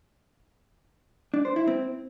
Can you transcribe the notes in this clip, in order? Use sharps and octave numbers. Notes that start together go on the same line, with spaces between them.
D4
C5
E4
C4